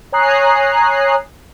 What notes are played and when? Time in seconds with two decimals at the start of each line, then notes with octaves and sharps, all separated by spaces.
0.12 C#5 G#5 A#5 D#6 F#6 C7